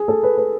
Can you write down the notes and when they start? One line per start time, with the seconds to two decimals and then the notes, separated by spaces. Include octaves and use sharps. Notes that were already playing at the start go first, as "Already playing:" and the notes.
Already playing: G#4
0.08 A4
0.23 B4
0.38 B4